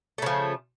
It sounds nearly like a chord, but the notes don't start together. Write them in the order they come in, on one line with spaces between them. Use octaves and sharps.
A3 C#3 F3